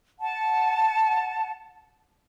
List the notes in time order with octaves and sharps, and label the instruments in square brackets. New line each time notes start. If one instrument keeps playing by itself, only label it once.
[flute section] F#5 A5